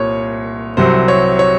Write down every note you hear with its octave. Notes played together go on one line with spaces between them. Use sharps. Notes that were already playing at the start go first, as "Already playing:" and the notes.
Already playing: C2 A#2 C#5
C2 C3 F#3 C5
C#5
C#5